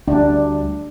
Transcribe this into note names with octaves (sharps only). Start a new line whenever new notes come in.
D2 G3 D4